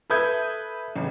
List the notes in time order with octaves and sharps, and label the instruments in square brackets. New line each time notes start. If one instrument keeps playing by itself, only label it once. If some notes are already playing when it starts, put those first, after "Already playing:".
[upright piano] A4 B4 E5 D#6 G6 G#6
A1 C#3